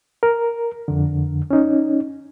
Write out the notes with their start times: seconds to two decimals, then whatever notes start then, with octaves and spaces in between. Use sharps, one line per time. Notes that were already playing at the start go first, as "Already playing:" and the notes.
0.23 A#4
0.88 F2 D3
1.50 C#4 D#4